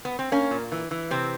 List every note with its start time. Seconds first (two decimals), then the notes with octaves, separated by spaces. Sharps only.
0.05 B3
0.19 C4
0.32 A#3 C#4
0.51 A#2
0.72 E3
0.91 E3
1.11 C3 C4